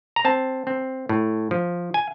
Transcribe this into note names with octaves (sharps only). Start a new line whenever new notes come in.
A#5
C4 A5
C4
A2
F3
G#5